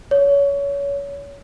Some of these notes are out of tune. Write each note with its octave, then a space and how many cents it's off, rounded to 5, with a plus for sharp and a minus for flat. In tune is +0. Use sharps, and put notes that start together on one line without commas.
C#5 +25